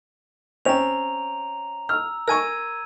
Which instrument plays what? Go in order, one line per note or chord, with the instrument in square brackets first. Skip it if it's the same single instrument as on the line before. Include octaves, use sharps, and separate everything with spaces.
[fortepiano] C4 C#4 G5 [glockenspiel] A#5 F7
[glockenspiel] E6 [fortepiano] F6
[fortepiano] A#4 G#5 C#6 [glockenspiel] E6 G#6 D#7